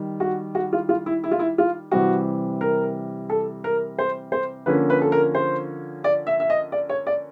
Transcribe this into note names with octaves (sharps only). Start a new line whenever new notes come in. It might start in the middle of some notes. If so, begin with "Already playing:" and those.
Already playing: D#3 G3
F#4
F#4
F4
F4
E4
E4
F4
E4
F4
C3 E3 G3 C4 F#4
A#4
A4
A#4
C5
C5
D3 F3 A#3 C#4 B4
B4
A4
A#4
C5
D5
E5
E5
D#5
D5
C#5
D5